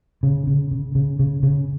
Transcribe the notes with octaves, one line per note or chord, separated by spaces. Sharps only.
C#3
C#3
C#3
C#3
C#3
C#3